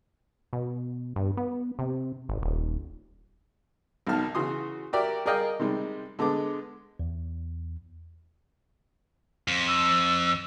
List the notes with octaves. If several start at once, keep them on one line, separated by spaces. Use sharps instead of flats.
B2
G2
B3
C3
G#1
D#1
B1 B2 D#3 A5 F6
C#3 E3 F#4 C6 D#6
F#4 G4 A#4 D5 E5
G#4 A#4 D5 D#5 F5 G5
C3 D#3 G3 G#3
D3 G#3 B3 D6
E2
F2
E6